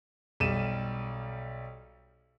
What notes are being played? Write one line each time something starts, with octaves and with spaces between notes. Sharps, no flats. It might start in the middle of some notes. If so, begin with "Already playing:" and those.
B1 G3 D#7 E7